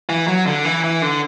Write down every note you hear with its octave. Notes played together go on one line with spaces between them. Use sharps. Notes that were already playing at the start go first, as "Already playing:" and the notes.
E3
F#3
D3
E3
E3
D3